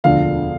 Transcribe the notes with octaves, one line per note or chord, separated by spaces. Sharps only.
E1 D2 D3 F3 F5